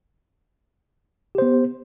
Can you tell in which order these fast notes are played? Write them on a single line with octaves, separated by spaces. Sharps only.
G4 C5 B3